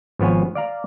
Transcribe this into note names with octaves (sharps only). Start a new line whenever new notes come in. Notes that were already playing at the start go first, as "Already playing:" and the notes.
G#1 F3 B3 C#5 G#5
D5 F5 A#5